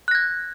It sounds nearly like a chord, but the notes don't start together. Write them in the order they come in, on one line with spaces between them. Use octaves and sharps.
F#6 A#6 G#6